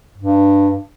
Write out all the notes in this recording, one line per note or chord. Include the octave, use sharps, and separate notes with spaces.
G2